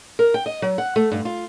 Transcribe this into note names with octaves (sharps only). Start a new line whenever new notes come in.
A#4
G5
D#5
F#3
F#5
A3
G2
F4